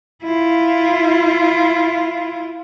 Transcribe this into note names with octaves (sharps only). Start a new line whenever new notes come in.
E4 F4